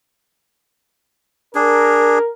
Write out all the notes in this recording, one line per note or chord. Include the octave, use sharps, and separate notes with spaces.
D4 G#4 A#4